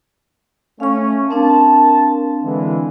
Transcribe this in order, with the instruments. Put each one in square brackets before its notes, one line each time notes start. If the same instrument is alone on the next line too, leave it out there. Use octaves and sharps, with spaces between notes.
[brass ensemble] A3 C#4 [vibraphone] F5 C#6
[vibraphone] C4 D4 F5 [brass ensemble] A#4 A5
[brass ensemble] D3 E3 G#3